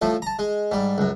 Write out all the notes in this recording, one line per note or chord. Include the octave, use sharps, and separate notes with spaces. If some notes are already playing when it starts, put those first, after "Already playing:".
A2 F3 A3
A5 A#5
G#3
G#2 G3
C#2 F#2